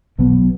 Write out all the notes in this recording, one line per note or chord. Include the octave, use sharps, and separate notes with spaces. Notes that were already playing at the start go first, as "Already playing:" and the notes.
B1 B2 F#3 B3